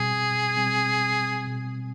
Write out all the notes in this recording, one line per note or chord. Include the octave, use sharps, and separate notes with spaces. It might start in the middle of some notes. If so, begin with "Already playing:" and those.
Already playing: B2 G3 C4 G#4
B2 G3 C4
B2